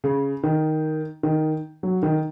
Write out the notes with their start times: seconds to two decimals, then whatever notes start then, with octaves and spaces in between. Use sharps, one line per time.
0.04 C#3
0.43 D#3
1.23 D#3
1.83 F#3
2.03 D#3